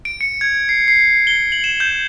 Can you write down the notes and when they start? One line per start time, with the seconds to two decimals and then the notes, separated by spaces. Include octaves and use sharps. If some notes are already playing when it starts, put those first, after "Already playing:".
0.05 D7
0.21 C#7
0.41 G#6
0.69 C7
0.88 C7
1.27 G7
1.52 F#7
1.64 E7
1.80 G6